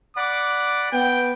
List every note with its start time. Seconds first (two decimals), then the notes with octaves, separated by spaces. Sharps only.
0.17 D5 F#5 B5 D6
0.93 B3 G5